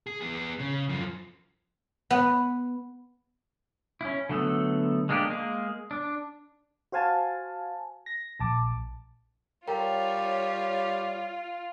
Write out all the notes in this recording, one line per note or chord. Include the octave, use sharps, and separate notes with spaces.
G#4
B3 G#4
C#3
F#2 F3
B3
C#4 E4
D3 F#3 A3 B3 A4
G#3 A#3 D4 D#4 G4
G#3 A#3 G#4
D4
F#4 C5 F5 G#5 A5
A#6
A#1 A5 D6
G3 F4 A#4 C#5 G5 A#5